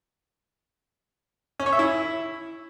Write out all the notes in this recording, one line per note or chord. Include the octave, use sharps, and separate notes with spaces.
C#4
C#5
E5
E4